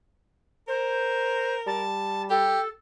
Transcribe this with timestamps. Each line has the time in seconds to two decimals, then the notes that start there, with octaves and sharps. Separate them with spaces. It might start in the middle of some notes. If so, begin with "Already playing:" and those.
0.68 A#4 C5
1.67 G3 A5
2.30 G4 A4